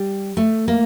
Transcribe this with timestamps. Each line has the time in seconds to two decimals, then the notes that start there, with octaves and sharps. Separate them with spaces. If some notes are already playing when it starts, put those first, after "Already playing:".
Already playing: G3
0.37 A3
0.68 A#3